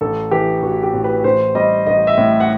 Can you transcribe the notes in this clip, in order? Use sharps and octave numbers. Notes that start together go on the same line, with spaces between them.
A1 A4
E3 G4
A1 F#4
G4
A2
B4
A1 C5
G3 D#5
A1 D#5
E5
A2
F#5